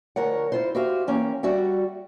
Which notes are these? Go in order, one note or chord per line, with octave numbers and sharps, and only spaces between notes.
D2 F3 A#4 C#5 F#5
E4 F4 C5
F#4 G4 C5 E5 F5
E3 A#3 C#4 G5
G3 F#4 E5 F#5